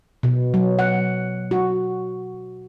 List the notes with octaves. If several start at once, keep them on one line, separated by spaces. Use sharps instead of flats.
B2
F#3
F#5
F#4